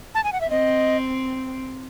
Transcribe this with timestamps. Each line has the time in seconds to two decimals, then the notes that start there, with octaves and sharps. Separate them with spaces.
0.15 A5
0.24 G#5
0.33 F#5
0.41 E5
0.50 C4 D#5